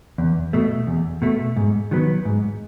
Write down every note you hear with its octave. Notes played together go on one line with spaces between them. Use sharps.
E2
B2 A3
E2
B2 A3
G#2
D#3 F#3 B3
G#2